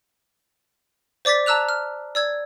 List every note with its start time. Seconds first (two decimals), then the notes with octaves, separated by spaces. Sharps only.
1.25 C5 D5 D6 A6 B6
1.46 A5 A#5 E6 F#6 F7
1.69 F6
2.15 D5 E6 G#6